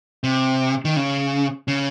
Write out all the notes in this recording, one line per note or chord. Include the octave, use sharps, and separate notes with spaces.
C3
D#3
C#3
C#3